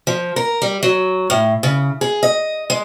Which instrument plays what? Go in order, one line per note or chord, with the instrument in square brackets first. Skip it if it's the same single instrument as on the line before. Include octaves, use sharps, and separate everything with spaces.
[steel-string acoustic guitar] F3
A#4
G3
F#3
A2
C#3
G#4
D#5
G#3